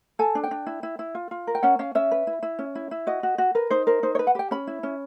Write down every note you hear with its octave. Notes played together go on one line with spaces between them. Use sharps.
A4 G#5
D4
G5
D4
E4
E4
E4
F4
F4
A#4
G5
C#4 F#5
C#4 F5
C#4 E5
B4
E4
E4
C#4
E4
E4
F#4 D#5
F#4
F#4
A#4 B4
D#4 C5
A#4 C5
D#4 C5
C#5
B4
F#5
G4 G5
C#4 B5
E4
C#4